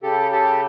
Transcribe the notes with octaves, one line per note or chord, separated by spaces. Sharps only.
C#3 G4 A4
G4 A4